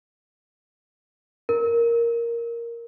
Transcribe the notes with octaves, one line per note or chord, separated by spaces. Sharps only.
A#4